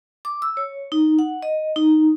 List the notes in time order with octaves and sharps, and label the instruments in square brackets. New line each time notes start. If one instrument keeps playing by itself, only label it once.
[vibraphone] D6
E6
C#5
D#4
F#5
D#5
D#4